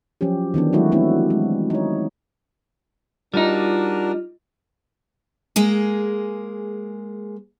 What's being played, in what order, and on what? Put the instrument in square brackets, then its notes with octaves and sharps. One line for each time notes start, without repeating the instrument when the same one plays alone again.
[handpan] F3 F#3 C#4 G4
D#3 E3 B3 D4
F#3 G#3 A3 D#4 E4 F#4
A3 B3 C4 D4 E4 F#4
G#3
D#4 C#5
[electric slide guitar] G3 D#4 [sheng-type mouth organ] D4 F#4 A#4 [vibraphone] F4
[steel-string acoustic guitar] G#3 A#3 G#4